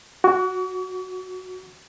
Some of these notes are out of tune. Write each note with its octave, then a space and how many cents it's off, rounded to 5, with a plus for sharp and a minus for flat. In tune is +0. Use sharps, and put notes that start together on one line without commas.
F#4 +0 C#6 +45